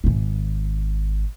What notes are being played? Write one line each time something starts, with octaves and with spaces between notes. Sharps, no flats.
G#1 D#3